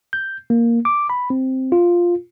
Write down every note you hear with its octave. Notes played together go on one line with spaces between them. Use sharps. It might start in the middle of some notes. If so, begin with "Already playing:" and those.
G6
A#3
D6
B5
C4
F4